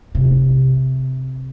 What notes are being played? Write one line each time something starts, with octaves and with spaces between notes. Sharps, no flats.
C3